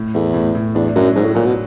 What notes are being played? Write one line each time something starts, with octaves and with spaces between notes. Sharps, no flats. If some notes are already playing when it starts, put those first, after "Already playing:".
Already playing: A2
E2 A3
A2
A2
E2 D4
F#2 F#3
G#2 F#3
A2
A#2 F#3
B2